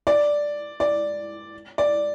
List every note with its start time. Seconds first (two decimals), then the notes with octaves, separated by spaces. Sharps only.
0.07 D5
0.80 D5
1.78 D5